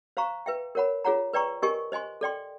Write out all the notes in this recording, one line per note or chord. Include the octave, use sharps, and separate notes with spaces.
C5 F5 A#5 C#6
B4 E5 G5
A#4 C#5 F#5 B5
F4 G#4 C#5 F#5 A#5
B4 D5 G5 A#5 C#6
G4 A#4 D#5 G#5 C#6
C5 D#5 G#5 C6
A4 D5 G5 C6